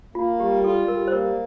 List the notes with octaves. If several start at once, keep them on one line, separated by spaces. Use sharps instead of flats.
A#3 F4
G3 G4
F4 A4
G3 A#4
C5
A#3 A#4